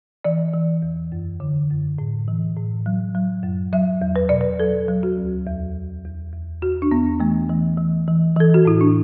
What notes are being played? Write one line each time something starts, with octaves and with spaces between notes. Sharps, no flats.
E3 D5
E3
E2
F#2
D3
F#2
A2
E3
A2
F#3
F#3
F#2
F#3 E5
E2
B4
B2 D5
B4
F#3 A4
F#3
F#4
D2
E2
E2
E2
E2
E2 F#4
D4
E2 B3
E3 A3
E3
E3
E3
E3 A4
F#4
A2 E4
D4